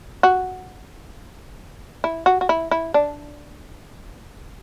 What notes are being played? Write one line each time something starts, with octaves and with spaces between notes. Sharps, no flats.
F#4
E4
F#4
F#4
E4
E4
D4